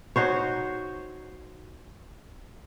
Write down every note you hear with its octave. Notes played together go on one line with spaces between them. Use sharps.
D#4 F#4 C5 C#5